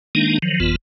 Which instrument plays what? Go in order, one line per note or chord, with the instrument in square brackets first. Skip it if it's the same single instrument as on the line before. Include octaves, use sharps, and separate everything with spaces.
[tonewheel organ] D#3 G#3 A#3 D4 D#4
D#3 F3 F#3
G1 F2 E3 B3 F4